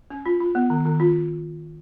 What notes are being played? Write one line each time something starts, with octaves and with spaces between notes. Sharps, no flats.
C#4
F4
F4
B3
D#3
D#3
F4